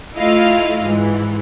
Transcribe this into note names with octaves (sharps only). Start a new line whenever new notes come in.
A3 E4 F4 D#5 F5
G#2 E3